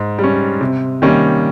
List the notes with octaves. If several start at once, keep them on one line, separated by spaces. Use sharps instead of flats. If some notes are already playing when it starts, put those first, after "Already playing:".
Already playing: G#2
G3
C#4
C3
D#3 G3 A#3 C#4